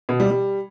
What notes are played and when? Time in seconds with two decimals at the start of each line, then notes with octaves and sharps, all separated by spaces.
0.09 B2
0.20 G3
0.31 G3